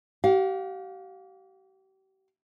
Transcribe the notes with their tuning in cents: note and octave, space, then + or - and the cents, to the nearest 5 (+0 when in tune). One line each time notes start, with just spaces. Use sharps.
G4 -40 F5 +25